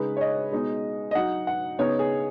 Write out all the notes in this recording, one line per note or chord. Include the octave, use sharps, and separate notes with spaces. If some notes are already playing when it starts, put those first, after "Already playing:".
Already playing: C#3 G#3 D#4 B4
C#5
D#5
B2 G#3 D#4
D#5
F#3 D#4 F#5
F#5
C#3 B3 D#4 C#5
G#4